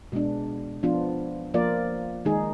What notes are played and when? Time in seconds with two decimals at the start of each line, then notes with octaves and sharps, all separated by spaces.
0.12 B2 G#3 B3 D4
0.83 F3 B3 D4 F4
1.54 F3 A#3 F4 A#4 D5
2.25 D#3 G#3 D#4 G#4